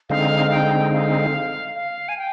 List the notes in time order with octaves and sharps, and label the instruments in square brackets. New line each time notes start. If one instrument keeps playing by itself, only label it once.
[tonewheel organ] D3 G#3 C4 D#4 [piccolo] F5
[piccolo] G5
F5
F5
G#5
G5